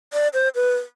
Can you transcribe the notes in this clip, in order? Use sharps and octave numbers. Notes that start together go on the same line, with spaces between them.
D5
C5
B4